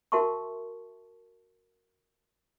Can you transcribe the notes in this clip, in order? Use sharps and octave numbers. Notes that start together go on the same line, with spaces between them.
F#4 A#4 E5 A5 C6 C#6